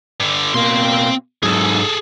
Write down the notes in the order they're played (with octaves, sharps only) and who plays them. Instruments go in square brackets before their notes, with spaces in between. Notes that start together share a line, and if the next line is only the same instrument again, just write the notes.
[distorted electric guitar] G2 D3
[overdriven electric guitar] B2 A#3 [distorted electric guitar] C4 C6
[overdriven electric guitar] G#2 F#3 [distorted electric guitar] G#4 A4